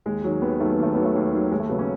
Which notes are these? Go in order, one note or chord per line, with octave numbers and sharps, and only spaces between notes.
D#2 G#3
D#3 F#3
D#2 B3
D#3 F#3 A3
B3
D#2 A3
D#3 F#3 B3
A3
D#2
D#3 F#3
D#2 G#3
A3
C#3 F#3 B3
C#4